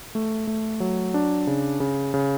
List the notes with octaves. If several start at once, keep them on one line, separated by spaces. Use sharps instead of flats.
A3
A3
F#3
D4
C#3
C#3
C#3